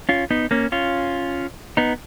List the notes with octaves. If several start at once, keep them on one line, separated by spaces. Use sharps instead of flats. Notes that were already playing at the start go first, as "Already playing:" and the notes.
C#4 F4
B3 D#4
A#3 C#4
C#4 F4
B3 D#4